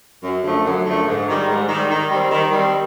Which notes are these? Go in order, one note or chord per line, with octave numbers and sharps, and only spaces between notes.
F#2
D3 F3 A3
F#2
D3 F3 A3
G#2
D#3 G3
G#2
D#3 G3
D#3
G3 C4
D#3
G3 C4